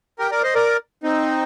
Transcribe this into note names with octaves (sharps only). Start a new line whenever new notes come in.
G4 A#4
A#4 D5
C5 D#5
A#4 D5
C4 D#4